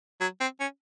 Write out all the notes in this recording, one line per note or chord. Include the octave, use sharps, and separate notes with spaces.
F#3
C4
C#4